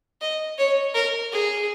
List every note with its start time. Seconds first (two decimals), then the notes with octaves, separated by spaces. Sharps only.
0.21 D#5
0.58 C#5
0.94 A#4
1.32 G#4